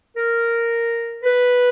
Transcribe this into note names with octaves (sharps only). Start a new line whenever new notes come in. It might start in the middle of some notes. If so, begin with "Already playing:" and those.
A#4
B4